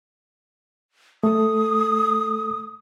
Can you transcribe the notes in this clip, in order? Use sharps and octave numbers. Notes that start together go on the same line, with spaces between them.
A3 A4 D#6